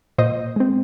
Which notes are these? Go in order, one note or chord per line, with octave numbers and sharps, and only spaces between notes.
A#2 C5 D#5
G#3 C4